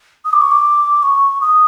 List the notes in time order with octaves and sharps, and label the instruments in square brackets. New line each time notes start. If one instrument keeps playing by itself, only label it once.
[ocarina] D#6
D6
C#6
D6
C#6
D#6